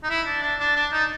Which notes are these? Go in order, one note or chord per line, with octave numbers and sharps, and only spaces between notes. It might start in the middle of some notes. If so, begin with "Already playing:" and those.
D#4
E4
D4
D4
D4
D4
D#4